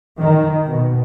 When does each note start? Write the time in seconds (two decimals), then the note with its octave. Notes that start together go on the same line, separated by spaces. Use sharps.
0.19 D#3
0.64 B2